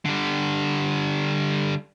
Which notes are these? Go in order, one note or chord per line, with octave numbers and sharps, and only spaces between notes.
D3 G3